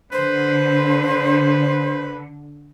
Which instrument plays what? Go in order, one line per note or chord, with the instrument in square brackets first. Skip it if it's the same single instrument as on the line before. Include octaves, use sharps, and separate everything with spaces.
[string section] D3 [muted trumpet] B4 [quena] C5